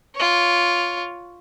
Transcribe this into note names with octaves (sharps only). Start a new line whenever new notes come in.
F4 C#5